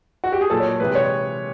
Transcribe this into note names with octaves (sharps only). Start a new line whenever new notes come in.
F#4
G4
G#4
A#2 F#3 A4
C#5
C3 E3 G#3 B4
C#5